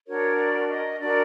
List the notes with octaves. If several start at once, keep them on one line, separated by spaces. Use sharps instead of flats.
D4 F#4 A#4 C#5
D5
D#5
D4 F#4 A#4 D5